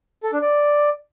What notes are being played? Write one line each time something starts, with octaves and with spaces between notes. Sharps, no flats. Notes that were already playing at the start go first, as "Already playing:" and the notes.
A4
D4
D5